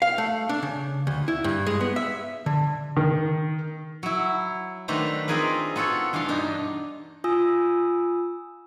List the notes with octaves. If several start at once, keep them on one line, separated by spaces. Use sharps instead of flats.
F5
A3
D4
C#3
D2
E4
G2
G#3
B3
E5
D3
D#3
F#3 E4
D#3 A3 D4 B4 C5 A#5
C4 D#4 F4 G#4 A#4 B4
B3 F4 F#4 A4 C#5
G2 E3 D4 F5 C6
B2 D4 D#4
F4 G#5 D#6 E6